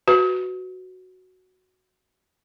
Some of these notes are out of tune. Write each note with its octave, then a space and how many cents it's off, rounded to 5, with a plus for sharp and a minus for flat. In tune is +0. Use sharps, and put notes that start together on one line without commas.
F#4 +0 B4 +10